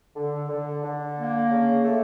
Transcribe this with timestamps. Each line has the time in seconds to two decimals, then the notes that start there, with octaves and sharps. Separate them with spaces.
0.16 D3
0.49 D3
0.83 D3
1.17 A#3
1.51 C#3
1.84 A3